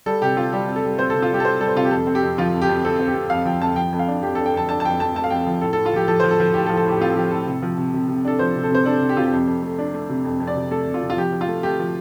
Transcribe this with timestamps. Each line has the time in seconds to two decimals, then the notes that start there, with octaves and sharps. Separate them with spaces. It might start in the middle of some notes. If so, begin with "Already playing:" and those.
0.06 G3 A4
0.22 C3 G4
0.37 C4 F4
0.53 G3 G4
0.68 C4
0.76 A4
0.84 G3
0.99 C4 C5
1.10 C3 A4
1.22 F4
1.30 G3 G4
1.40 A4
1.45 C4 C5
1.60 G3 A4
1.68 C5
1.76 C3 F4
1.85 G4
1.91 F2 A4
2.07 C4
2.15 G4
2.23 F2
2.38 F3 F4
2.53 F2
2.62 G4
2.69 F2
2.84 C4 A4
2.99 C4
3.08 G4
3.15 C4
3.30 F2 F5
3.45 F3 G5
3.61 F2 A5
3.76 F3 G5
3.93 F2
3.99 F5
4.08 D4
4.23 F2 G4
4.35 D4 A4
4.46 G5
4.54 F2 A5
4.69 D4 A5
4.80 A5
4.84 F2 G5
5.00 F2 A5
5.15 A3 A5
5.24 F5
5.30 F2 G5
5.47 F3
5.61 A2 A4
5.73 A2 A4
5.86 F4
5.93 F3 G4
6.08 F3 A4
6.20 F3 C5
6.31 A4
6.40 F3
6.54 A2 G4
6.66 A4
6.69 F3
6.77 A4
6.86 A2 G4
6.97 G4
7.01 C4 F4
7.12 A4
7.16 F3 G4
7.31 A2 A4
7.47 C3
7.62 F3
7.78 C3
7.94 C3
8.08 C3
8.25 D4 A4
8.39 F3 C5
8.56 C3
8.63 A4
8.70 C3 C5
8.85 D4 A4
9.01 C3
9.09 G4
9.17 C3 F4
9.25 G4
9.33 F2
9.47 F2
9.63 A3
9.79 D4
9.94 A3
10.09 C3
10.25 F2
10.40 F2
10.47 D5
10.55 C3
10.71 A3 A4
10.87 C3
10.94 F4
11.02 C3
11.10 F4
11.17 F3 G4
11.32 F3
11.41 F4
11.48 A3
11.63 A3 G4
11.80 F3